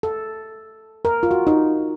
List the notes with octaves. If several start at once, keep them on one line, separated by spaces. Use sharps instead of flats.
A4
A#4
F4
F#4
D#4